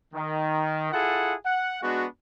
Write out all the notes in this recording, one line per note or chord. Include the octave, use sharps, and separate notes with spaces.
D#3
E4 F4 G#4 A4 F#5
F#5
G#3 B3 D4 F#4